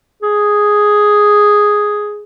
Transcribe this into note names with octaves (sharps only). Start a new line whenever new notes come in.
G#4